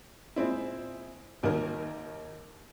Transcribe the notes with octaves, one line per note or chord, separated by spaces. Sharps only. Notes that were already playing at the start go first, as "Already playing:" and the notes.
A#2 G#3 C4 E4
G#1 D#2 D#3 D#4 A#4